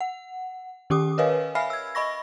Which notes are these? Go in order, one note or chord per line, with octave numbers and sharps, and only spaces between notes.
F#5
D#3 C#4 G4 D6 D#6
A#4 B4 C#5 D#5 F5 G#5
E5 F5 G#5 B5 F6 C7
E6 G#6
D#5 B5 C#6 A#6